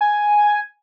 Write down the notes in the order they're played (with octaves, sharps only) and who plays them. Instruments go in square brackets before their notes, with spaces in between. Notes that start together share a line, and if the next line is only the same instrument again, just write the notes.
[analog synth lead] G#5